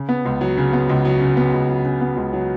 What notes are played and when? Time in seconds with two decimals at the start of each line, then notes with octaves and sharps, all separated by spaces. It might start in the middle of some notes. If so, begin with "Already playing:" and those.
Already playing: C#3
0.09 B3
0.25 C#2
0.41 F#3
0.57 C#3
0.73 B3
0.89 C#2
1.05 F#3
1.21 C#3
1.37 B3
1.53 C#2
1.69 F#3
1.85 C#3
2.01 B3
2.17 C#2
2.33 F#3